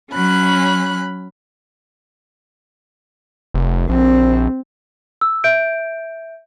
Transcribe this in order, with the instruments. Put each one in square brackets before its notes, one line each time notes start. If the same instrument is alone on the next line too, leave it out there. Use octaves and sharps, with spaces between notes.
[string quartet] F#3 C#4 B5 F#6
[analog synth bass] F1
[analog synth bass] A#1 [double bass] C4
[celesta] E6
E5 G6 D7